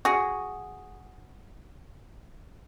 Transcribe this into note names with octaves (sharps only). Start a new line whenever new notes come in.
F#4 G#4